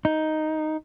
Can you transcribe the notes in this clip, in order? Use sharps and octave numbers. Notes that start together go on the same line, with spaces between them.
D#4